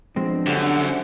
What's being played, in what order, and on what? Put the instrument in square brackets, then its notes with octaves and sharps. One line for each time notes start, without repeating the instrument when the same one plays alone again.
[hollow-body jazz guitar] F3 G#3 C4 [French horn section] B3 D4 C5
[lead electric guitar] F#2 [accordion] D3 [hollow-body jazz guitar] G4